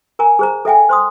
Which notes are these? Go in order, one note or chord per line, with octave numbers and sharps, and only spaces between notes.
A#4 G#5 A#5
G#4 C5 A#5
A4 E5 G5 G#5
C5 C6 D#6